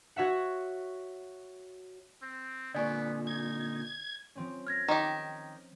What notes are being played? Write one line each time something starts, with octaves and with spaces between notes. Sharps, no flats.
F#4 C#5 E5 F#5
C4
A#2 D3 B3 D5 G#5 C#6
D#4 G#6
F3 C4 C#4
F6 G#6 A#6
D#3 G4